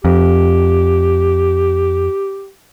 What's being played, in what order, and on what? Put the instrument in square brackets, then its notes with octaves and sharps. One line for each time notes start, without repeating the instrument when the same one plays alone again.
[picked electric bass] F2 [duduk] G4